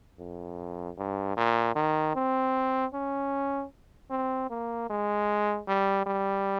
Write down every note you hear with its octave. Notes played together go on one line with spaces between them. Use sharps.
F2
G2
A#2
D#3
C4
C#4
C4
A#3
G#3
G3
G3